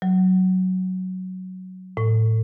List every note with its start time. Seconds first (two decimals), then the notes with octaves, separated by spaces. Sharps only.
0.02 F#3
1.97 A2